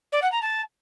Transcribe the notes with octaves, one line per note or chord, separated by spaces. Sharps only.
D5
F#5
A#5
A5